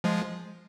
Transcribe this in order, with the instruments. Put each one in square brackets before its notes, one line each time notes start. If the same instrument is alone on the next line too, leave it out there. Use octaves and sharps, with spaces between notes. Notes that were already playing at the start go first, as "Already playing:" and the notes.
[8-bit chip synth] F3 G#3